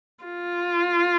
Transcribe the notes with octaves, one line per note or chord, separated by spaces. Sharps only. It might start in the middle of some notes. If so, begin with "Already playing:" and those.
F4